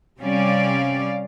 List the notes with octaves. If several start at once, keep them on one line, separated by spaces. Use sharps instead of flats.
C3 G3 C#4 D5 F5